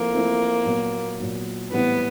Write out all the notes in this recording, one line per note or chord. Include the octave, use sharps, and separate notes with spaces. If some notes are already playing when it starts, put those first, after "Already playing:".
Already playing: F3 A3 A#3 C4 E4
F3 A3 C4 E4
A#2 F#3 B3
A#2 F#3 B3
A2 E3 G3 B3 C4 E4